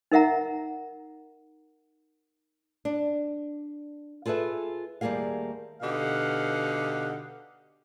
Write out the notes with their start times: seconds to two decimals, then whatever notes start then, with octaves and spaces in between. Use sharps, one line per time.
0.12 D#4 A#4 E5 F#5 A#5
2.85 D4
4.26 F4 G#4 A4 B4 E5
5.01 D#2 G3 A3 A#3 G#4 F5
5.82 B2 D3 D#4 G4 F5 F#5